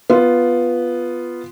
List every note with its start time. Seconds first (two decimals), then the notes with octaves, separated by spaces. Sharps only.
0.10 B3 F4